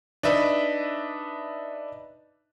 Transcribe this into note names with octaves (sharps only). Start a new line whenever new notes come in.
D4 D#4 B4 E5